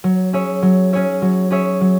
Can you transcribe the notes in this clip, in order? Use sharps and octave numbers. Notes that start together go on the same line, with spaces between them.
F#3
C#4 G#4 C#5 E5
F#3
C#4 G#4 C#5 E5
F#3
C#4 G#4 C#5 E5
F#3